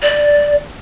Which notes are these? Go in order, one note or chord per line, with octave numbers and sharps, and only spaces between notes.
D5